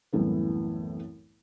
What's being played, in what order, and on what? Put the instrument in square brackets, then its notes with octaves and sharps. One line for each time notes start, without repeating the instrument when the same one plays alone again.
[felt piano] C2 F#2 A2 E3 B3